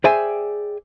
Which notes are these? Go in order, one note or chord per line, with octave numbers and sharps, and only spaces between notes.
G#4 C5 D5 E5 G5 G#5